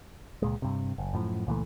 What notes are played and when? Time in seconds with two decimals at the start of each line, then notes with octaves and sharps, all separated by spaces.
0.42 C#2 A#2 G#3
0.62 G2 C3
0.98 F#1
1.14 F#2 A2 F3
1.47 C#2 A#2 E3 A3